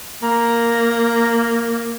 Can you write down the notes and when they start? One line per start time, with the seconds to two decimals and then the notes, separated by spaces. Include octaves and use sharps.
0.23 A#3 A#5